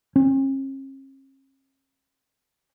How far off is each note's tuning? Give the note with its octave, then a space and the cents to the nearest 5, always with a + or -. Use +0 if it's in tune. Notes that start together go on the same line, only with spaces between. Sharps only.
C#4 -45